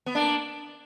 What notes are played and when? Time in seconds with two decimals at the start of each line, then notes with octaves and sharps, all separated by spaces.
0.06 B3
0.15 A#3 D4